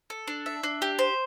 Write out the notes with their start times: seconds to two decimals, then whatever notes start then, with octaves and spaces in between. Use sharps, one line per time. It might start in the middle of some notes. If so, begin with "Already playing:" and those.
0.10 A4
0.28 D4
0.46 E5
0.63 D4
0.82 G4
0.99 C5